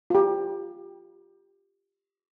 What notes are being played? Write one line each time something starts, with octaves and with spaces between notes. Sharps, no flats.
F4 G4